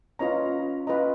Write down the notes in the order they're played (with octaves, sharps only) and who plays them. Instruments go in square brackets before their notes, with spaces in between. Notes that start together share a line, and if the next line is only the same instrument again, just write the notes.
[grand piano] C#4 [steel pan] F4 B4 D#5 A#5
[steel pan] F4 B4 D#5 A#5